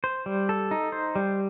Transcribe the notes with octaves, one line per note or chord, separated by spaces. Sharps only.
C5
G3
A4
D#4
C5
G3